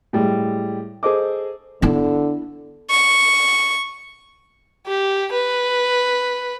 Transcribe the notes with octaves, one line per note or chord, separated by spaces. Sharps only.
A2 G3 G#3
G#4 A4 C5 D#5 D6
D3 B3 E4
C#6
G4
B4